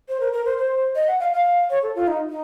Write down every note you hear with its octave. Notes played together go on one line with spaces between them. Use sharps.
C5
A#4
A#4
C5
C5
D#5
F#5
F5
F5
C#5
A4
F4
D#4
D#4